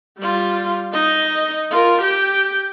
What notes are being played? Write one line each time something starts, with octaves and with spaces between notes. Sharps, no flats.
G3 F4
D#4 D#5
F4 A#4
G4 G5